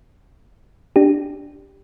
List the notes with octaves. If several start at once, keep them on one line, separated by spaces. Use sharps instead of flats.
D4 G4